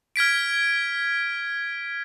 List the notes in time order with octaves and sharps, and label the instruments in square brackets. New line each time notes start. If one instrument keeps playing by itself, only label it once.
[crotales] F6 G#6 B6 D7